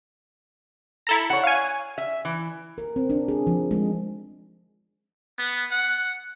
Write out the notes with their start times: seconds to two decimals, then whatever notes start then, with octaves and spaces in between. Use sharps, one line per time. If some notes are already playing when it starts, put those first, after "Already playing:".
1.07 E4 A4 A#5
1.30 C#5 F#5
1.44 F5 G#5
1.98 E5
2.25 E3
2.78 A#4
2.96 C4
3.10 D4
3.28 G#4
3.47 F3
3.71 G#3
5.39 B3
5.71 F#5